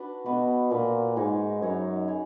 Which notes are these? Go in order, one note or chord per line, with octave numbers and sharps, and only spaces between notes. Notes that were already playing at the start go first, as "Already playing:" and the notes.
Already playing: D4 F#4 B4
B2 D4 F#4 B4
A#2 D4 F#4 B4
G#2 D#4 G#4 C#5
F#2 D#4 G#4 C#5
G#4 C#5